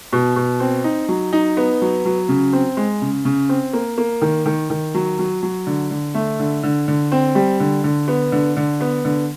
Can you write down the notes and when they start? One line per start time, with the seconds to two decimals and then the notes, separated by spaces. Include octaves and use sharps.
0.13 B2
0.36 B2
0.60 C4
0.84 D#4
1.08 F#3
1.33 D#4
1.57 B3
1.82 F#3
2.05 F#3
2.29 C#3
2.53 C4
2.77 G#3
3.02 C#3
3.25 C#3
3.49 C4
3.73 A#3
3.98 A#3
4.22 D#3
4.46 D#3
4.70 D#3
4.94 F#3
5.19 F#3
5.43 F#3
5.67 D3
5.91 D3
6.15 A3
6.39 D3
6.63 D3
6.88 D3
7.12 C4
7.35 G3
7.60 D3
7.84 D3
8.08 B3
8.32 D3
8.57 D3
8.81 B3
9.05 D3